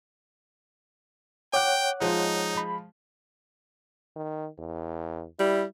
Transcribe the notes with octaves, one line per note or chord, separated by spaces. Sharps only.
C#5 F#5 G5 D6 F#6
F3 G#3 D#4 F4
B5
D#3
E2
G3 E4